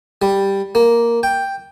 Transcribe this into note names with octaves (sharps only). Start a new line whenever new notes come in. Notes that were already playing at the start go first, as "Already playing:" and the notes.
G3
A#3
G5